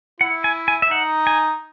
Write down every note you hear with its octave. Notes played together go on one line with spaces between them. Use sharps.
E4 F#5
G#5
G#5
E5
D#4 F#5
G#5